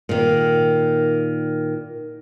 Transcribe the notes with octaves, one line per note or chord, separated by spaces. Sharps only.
A#2 D#3